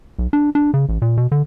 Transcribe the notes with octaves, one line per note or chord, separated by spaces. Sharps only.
B1
D4
D4
C#3
A1
A#2
B2
D3